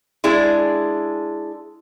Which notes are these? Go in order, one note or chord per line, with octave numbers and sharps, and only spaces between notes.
G#3 D4 E4 G#4